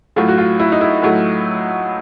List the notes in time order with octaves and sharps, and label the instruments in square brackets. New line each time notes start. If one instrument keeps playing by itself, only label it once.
[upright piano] A2 F#3 A3 F4
F#4
F4
E4
D#4
E4
A2 F#3 A3